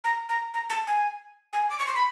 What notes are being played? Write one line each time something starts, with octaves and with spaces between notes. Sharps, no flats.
A#5
A#5
A#5
A5
G#5
G#5
D6
C#6
C6
B5